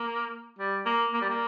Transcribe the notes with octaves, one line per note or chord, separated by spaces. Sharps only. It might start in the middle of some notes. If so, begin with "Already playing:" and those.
Already playing: A#3
G3
A#3
A#3
G3
A#3